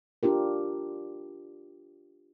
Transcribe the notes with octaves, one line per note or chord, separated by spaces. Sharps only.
D4 F4 G4 A#4